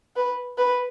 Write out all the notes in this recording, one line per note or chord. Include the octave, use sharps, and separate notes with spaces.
B4
B4